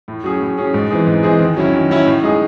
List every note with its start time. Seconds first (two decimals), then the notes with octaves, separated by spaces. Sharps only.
0.08 A2
0.24 F#3 C#4 G#4
0.41 A2
0.58 F#3 C#4 G#4
0.74 G#2
0.90 E3 C4 D#4 G#4
1.07 G#2
1.23 E3 C4 D#4 G#4
1.40 D#3
1.57 F#3 C#4 E4
1.73 D#3
1.90 F#3 C#4 E4
2.06 A2
2.23 G#3 D#4 G#4